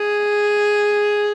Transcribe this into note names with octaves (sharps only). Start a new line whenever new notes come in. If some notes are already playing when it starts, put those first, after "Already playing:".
Already playing: G#4